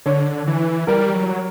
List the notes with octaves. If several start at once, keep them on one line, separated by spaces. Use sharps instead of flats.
D3 C#5
E3
G3 A#4
F#3